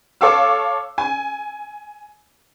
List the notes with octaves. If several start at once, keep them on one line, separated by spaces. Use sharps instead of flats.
A4 C#5 F5 D6 E6
G#5